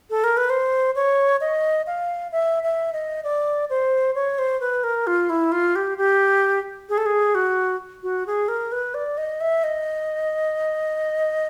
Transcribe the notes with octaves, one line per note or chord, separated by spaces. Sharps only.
A4
A#4
B4
C5
C#5
D#5
F5
E5
E5
D#5
D5
C5
C#5
C5
B4
A#4
F4
E4
F4
G4
G4
G#4
A4
G#4
F#4
F#4
G#4
A#4
B4
D5
D#5
E5
D#5